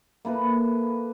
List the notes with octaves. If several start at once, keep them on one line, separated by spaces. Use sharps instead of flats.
A#3 E4 A4 B4